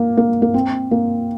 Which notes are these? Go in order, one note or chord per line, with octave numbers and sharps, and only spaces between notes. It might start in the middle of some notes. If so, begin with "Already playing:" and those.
Already playing: A#3
A#3
A#3
C4
A#3